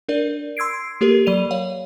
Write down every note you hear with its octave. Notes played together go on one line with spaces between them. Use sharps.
D4 A#4 D5
C6 E6 G#6 C7 D7
A#3 G4 A4 A#4
F#3 D5 D#7 F7
C#5 F5